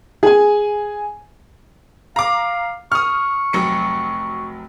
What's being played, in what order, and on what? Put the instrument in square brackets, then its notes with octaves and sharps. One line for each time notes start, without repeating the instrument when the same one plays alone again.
[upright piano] G#4 G#5
[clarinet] F5 [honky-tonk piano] A#5 D6
[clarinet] C#6 [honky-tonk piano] D#6 F6
[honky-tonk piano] F1 F#3 C#7